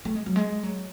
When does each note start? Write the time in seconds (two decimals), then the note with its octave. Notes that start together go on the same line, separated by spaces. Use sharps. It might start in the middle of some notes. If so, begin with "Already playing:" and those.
0.05 A3
0.15 G#3
0.26 F#3
0.36 G#3
0.63 F#3